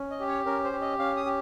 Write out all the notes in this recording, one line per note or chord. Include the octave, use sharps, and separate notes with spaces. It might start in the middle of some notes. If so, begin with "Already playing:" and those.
Already playing: C#4
D#5
G4
C#5
C#4 A#4
C5
G4
D#5
C#4 F5
D#6
G4